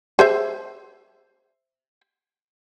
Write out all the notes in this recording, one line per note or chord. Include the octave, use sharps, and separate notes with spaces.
G#4 C5 E5